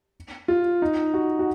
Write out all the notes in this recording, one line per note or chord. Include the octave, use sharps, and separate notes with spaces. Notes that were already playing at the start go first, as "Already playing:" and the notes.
F4
D#4
F#4
F#4